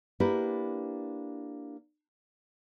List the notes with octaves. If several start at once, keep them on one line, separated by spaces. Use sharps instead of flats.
A#3 D4 E4 G4 B4